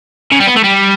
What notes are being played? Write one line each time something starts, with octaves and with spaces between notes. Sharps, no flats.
C#3
G3
B3
A3
G3